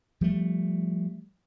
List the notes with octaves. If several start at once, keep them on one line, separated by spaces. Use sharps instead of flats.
F3 G3 A3